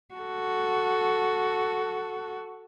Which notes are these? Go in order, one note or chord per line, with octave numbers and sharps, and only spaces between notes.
F#4 A4